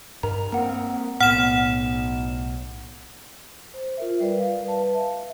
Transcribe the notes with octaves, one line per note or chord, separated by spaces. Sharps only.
G2 A#4 A#5
A#3 C4 F#5 A#5
B1 A2 B3 F#5 F6 E7
C5
F4 A#4 E5
G3 B4 D5
F5
B4 F5 A5
E5